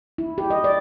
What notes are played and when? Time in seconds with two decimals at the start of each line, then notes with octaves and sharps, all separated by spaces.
0.18 E4
0.38 G4
0.50 D#5
0.64 D5